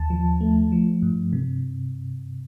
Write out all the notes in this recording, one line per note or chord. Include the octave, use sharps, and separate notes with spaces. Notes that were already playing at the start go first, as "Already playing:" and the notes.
Already playing: D#2 A5
F3
A3
F3
G2
C3